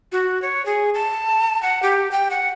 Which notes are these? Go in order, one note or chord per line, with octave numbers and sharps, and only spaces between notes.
F#4
C#5
G#4
A5
F#5
G4
G5
F#5